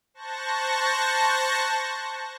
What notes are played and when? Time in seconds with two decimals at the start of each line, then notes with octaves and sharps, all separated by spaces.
0.14 C5 A5 C#6 F#6 A#6